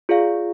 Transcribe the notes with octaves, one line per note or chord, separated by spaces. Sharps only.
F4 G#4 D5 F5